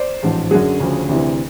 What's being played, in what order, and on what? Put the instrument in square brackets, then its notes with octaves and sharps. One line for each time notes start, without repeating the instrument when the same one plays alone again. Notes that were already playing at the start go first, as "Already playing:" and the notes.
Already playing: [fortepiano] C5 D5
A1 G#2 F3
F#2 D3 F#3 F#4 G#4
D2 C#3 F3
D2 C3 E3